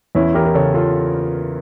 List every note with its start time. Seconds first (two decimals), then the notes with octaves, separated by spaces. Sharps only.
0.15 E2 C#4 E4
0.35 E3 G4 A#4
0.45 A#4
0.54 C#3 A4 C#5
0.74 F4 A4